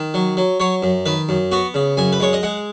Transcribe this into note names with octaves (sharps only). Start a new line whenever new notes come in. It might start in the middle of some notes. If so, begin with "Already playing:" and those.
Already playing: D#3
F#3
F#3
F#3 C#5
F#2
D#3 B4
F#2
B3 F#4
C#3
F#2 G#5
B4
G#3 C#5
D#5
G#3 F#5